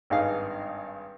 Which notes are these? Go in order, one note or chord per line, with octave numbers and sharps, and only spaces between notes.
G#1 G2 D#4 G#4 F5